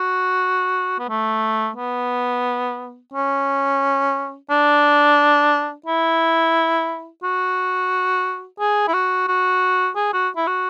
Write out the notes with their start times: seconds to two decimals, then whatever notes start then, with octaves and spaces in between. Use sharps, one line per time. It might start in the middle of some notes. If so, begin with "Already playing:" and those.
Already playing: F#4
0.99 B3
1.09 A3
1.77 B3
3.13 C#4
4.50 D4
5.86 E4
7.23 F#4
8.60 G#4
8.88 E4
8.94 F#4
9.28 F#4
9.96 G#4
10.13 F#4
10.37 E4
10.47 F#4